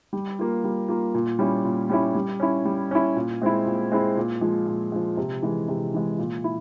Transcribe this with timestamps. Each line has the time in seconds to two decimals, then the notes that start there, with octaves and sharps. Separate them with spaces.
0.13 G3
0.39 A#3 F4
0.64 G3
0.88 A#3 F4
1.14 A#2
1.39 G3 C#4 E4
1.65 A#2
1.89 G3 C#4 E4
2.15 G3
2.40 C#4 E4
2.65 G3
2.91 C#4 E4
3.16 A#2
3.42 G#3 C4 E4
3.67 A#2
3.92 G#3 C4 E4
4.17 A#2
4.41 F3 G#3
4.67 A#2
4.92 F3 G#3
5.17 C3
5.42 E3 G#3
5.69 C3
5.94 E3 G#3
6.19 A#2
6.44 E4